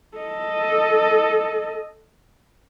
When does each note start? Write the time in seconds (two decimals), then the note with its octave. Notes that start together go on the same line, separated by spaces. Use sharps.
0.17 A4 D#5